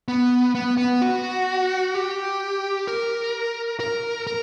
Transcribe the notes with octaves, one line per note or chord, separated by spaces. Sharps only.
B3
B3
B3
F#4
G4
A#4
A#4
A#4